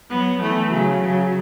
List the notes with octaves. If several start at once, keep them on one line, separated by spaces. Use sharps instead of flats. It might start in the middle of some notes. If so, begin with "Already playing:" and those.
F#3 B3
E3 A3
C#3 F#3
C#3 F#3